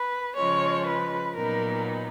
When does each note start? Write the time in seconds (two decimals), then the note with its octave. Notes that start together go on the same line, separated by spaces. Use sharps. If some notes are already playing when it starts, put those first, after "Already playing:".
Already playing: B4
0.36 C#3 F3 G#3 C#5
0.87 B4
1.36 A#2 F#3 B3 D#4 A#4